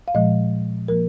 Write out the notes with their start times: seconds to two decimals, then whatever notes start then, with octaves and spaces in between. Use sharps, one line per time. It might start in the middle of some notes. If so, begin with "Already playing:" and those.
0.08 F5
0.15 A#2 F3 G#3 D#5
0.88 F3 A#3 A#4